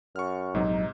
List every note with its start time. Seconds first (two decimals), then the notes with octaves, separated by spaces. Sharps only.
0.16 F#2 C#6 F6
0.55 A#1 G#2 C3 F#3 D#4